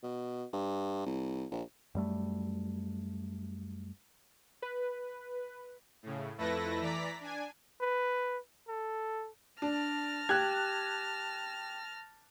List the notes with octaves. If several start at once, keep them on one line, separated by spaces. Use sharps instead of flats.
B2
G2
C2
A#1
F#2 G3 A3
B4
A2 C#3
F2 A3 E4 A4 B4 A#6
E3 D5 A#5 B6
D4 G#5
B4
A4
D4 A5 F6 A#6
G4 F#6 G#6